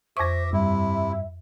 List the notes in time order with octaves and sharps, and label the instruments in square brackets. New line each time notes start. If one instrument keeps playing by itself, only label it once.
[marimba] F2 C#6 [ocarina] C5 [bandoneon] E5 [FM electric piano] D6 A#6
[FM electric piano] G2 [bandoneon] C3 E4 [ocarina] E5